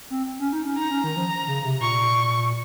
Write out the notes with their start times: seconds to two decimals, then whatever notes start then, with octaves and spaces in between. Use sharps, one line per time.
0.10 C4
0.39 C#4
0.52 D#4
0.65 C#4
0.78 D#4 A#5
0.91 C#4
1.04 D#3
1.17 F3
1.47 C#3
1.64 C3
1.81 A#2 C#6